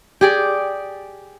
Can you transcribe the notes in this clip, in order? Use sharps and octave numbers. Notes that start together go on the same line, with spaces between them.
G4 G#4 D5